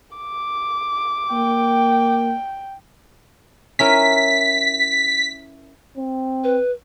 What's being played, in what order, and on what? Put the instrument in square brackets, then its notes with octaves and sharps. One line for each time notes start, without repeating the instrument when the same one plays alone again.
[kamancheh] D6
[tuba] A#3 [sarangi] G5
[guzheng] C#4 E4 A#4 [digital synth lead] B6
[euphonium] C4
[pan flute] B4